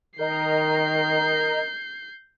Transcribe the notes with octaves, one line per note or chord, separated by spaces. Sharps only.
D#3 A#4 D#5 A#5 G6 C7